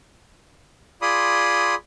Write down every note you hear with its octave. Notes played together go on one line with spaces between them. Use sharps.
F4 G#4 D5 B5 C6 D#6